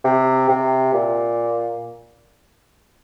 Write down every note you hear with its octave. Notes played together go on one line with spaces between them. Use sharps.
C3
C3
A#2